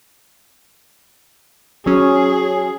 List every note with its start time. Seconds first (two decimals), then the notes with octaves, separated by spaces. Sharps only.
1.86 F#3 C#4 G#4